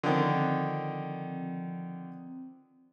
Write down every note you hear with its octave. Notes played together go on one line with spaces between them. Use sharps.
D3 D#3 F3 C4